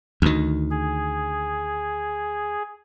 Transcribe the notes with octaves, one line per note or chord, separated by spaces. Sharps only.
D2 D#3
G#4